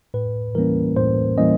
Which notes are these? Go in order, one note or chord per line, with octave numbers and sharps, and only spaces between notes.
A2 B4
E3 G3 A#3 C#4 A#4
A2 C5
E3 G3 A#3 C#4 D#5